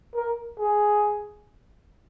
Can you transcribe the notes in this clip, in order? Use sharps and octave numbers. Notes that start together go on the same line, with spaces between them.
A#4
G#4